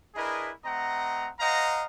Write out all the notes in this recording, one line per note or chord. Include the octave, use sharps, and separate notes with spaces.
D4 E4 G#4 A#4 B4 D#5
A3 C4 D#5 F#5 A#5
C5 D#5 F5 F#5 A#5